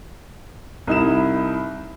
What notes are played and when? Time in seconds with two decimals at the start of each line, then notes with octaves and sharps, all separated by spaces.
0.87 C2 D#4 E4 E7